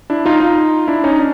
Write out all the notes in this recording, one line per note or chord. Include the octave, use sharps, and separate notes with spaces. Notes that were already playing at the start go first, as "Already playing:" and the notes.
D4 E4
D#4 F4
D#4 F4
D4 E4
C#4 D#4
D4